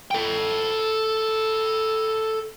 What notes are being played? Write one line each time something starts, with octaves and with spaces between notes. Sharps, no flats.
A4 G5